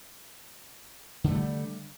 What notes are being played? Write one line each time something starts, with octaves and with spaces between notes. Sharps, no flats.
D3 F#3 G3 A3